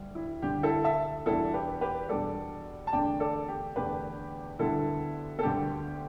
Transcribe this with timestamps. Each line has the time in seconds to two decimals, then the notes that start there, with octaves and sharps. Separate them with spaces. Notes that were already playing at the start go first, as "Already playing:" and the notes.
Already playing: D2 G3
0.15 E4
0.42 D2 D3 G3 G4
0.63 E4 A4
0.84 E5 A5
1.26 E2 B2 G3 D4 E4 A4
1.54 G4 B4
1.81 G4 B4
2.09 E2 B2 G3 D4 A4 D5
2.87 A5
2.93 E2 D3 A3 D4 D5 G5
3.20 A4 D5
3.48 G4
3.76 E2 D3 A3 D4 G4 B4
4.59 D2 D3 G3 B3 E4 A4
5.39 A4
5.43 D2 D3 G3 B3 G4